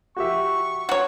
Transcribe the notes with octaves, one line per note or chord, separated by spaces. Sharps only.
F#4 G4 E5 C#6
F#4 C#5